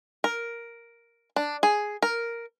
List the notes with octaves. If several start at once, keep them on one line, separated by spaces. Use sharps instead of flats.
A#4
D4
G#4
A#4